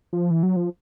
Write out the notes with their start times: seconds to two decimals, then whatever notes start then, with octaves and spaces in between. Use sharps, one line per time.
0.13 F3
0.30 E3
0.43 F#3
0.56 F3